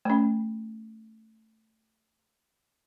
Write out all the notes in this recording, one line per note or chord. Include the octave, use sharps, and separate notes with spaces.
A3 C#4